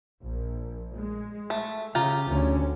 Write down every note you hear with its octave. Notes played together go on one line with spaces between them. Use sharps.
A#1
G#3
A3
C#3 F4 G4 A#5
D2 D3 C#4